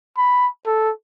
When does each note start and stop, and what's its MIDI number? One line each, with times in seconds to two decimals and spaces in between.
0.17 0.47 83
0.66 0.91 69